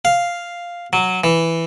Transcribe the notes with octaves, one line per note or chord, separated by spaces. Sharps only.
F5
F#3
E3